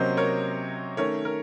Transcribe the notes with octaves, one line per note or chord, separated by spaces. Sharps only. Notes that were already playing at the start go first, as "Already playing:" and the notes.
Already playing: C3 F#3 A#3 C#4 C5 D#5
A#4 C#5
D#3 A3 C#4 A#4 C#5
A#4